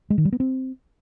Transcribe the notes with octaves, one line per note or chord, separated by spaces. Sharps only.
G#3
D#3
G3
B3
C4